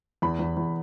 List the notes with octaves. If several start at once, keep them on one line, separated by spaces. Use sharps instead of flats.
E2 B5
E2
E2